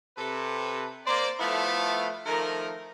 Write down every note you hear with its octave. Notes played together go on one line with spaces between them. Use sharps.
C3 A4 B4
A#3 C5 D5
F3 A3 B3 E4 A4 F5
D#3 F3 A3 A#4